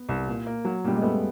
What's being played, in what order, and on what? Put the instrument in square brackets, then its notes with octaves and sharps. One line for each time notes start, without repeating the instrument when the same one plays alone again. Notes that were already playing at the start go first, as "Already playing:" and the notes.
Already playing: [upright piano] B3
[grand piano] C2
A#2
A#3
F#3
[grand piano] A#2 [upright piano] G3
[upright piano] G#3
[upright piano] A3 [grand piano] B3